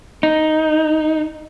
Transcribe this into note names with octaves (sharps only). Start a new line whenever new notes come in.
D#4